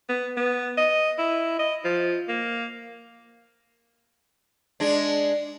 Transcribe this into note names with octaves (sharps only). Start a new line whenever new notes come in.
B3
B3
D#5
E4
D#5
F3
A#3
G#3 D4